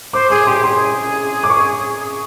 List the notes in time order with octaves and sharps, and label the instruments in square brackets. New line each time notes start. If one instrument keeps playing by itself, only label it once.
[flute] C5 [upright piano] D6
[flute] G#4 [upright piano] D6
[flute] G4 [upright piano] C6
[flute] G#4 [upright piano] C6
[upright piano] D6
C#6